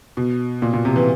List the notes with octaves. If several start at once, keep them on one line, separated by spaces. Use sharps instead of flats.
B2
A#2
A#2
C3
E3